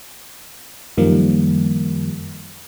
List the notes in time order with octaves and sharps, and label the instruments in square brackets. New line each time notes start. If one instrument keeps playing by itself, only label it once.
[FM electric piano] F#2 D#3 F3 G3 A#3